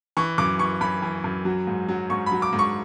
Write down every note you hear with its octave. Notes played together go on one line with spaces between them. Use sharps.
E3 C#6
F#2 D6
E3 C#6
F#2 B5
E3
F#2
F#3
G#2
F#3
G#2 C#6
B5
F#3
D6
G#2
C#6